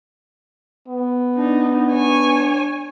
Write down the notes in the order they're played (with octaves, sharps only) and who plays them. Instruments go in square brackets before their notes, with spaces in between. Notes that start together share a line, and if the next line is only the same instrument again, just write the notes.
[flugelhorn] B3
[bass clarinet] D4 [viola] D#4
[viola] C#5 G#5